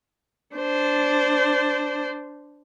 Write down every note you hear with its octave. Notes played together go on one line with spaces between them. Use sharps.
D4 C5